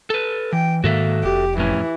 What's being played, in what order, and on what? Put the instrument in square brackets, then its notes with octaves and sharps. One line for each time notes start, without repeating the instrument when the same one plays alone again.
[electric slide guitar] A4 B4
[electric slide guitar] E3 [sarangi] G5
[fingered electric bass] G#2 D#3 [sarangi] A#3 [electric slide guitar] F#4 A4 E5
[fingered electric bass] F1 [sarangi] G4
[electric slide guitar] F2 A2 C#4 [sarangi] E3